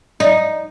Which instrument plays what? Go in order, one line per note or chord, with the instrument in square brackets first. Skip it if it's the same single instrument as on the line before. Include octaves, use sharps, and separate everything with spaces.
[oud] D#4